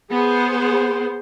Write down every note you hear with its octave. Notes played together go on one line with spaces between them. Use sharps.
B3 G#4 C5